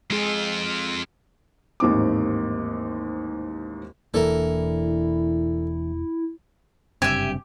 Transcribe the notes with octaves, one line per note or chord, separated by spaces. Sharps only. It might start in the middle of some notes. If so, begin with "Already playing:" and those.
F2 G#3 F4 G#4
A1 D#2 G#2 C4 D6
E1 E3 A#3 D4 E4 A4 A#4 D5
F#1 G2 C3 G4 E5 G#5